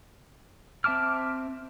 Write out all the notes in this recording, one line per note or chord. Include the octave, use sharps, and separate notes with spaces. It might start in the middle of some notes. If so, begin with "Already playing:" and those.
C4 E5 A5 D6 F6